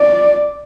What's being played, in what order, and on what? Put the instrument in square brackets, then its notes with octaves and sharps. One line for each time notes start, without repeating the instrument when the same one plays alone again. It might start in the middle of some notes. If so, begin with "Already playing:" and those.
Already playing: [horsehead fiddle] D5